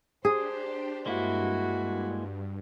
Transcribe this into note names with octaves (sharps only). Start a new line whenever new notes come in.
D4 G4 G#4 C5
G2 G#3 A#3 E4 F#4